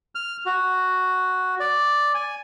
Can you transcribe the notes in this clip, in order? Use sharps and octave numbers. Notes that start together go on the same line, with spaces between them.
F6
F#4
D5
G#5